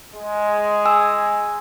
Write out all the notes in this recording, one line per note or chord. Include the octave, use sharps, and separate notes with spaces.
G#3
G#5 E6